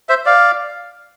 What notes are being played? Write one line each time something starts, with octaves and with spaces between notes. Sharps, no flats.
C5 E5
D5 F5